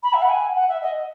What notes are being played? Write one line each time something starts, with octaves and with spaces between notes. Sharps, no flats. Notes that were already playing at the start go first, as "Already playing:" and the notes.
B5
E5
F#5
G#5
F#5
E5
D#5